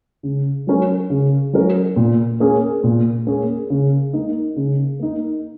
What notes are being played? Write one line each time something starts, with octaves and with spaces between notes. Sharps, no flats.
C#3
F#3 C#4 A#4
C#3
F#3 C#4 A#4
A#2
A#3 C#4 G#4
A#2
A#3 C#4 G#4
C#3
A#3 D#4
C#3
A#3 D#4